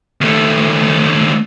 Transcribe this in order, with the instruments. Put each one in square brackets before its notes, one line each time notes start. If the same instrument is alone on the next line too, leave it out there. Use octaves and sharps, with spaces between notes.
[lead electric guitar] D#2 A3